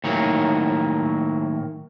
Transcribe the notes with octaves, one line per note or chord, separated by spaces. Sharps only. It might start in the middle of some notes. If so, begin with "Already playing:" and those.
A2 D#3 F#3 A#3